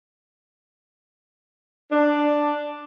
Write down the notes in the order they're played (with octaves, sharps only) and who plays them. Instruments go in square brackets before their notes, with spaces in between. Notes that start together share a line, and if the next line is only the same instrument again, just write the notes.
[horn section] D4